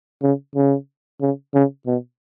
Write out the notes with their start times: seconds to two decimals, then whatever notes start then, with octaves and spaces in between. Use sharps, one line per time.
0.23 C#3
0.55 C#3
1.21 C#3
1.54 C#3
1.87 B2